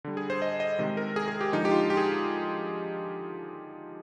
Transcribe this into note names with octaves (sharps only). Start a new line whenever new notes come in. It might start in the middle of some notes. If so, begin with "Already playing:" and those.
D3 G3
G#4
C5
D#5
D#5
C3 D#3 G#3
A#4
G#4
G#4
G4
D3 F3 G#3 D#4
G4
F4
G4
G#4